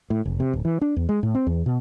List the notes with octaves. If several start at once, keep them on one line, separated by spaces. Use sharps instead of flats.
A2
F1
C3
D1
E3
D4
E2
G#3
A2
C4
E2
B2